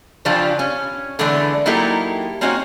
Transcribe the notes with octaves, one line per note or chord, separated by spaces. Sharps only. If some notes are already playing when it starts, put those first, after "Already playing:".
C#3 E3 F3 D4 F4 G4
C#4
D3 E3 G#3 A3 B3 D4
F#3 A#3 D#4 E4 G4 A4
A#3 C4 C#4 D#4 F#4